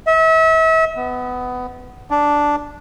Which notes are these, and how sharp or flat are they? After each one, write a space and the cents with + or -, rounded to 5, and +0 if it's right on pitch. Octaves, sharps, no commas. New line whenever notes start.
E5 -35
B3 +15
D4 -5